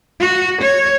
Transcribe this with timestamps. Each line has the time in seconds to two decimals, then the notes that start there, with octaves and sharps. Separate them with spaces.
0.20 F#4
0.61 C#5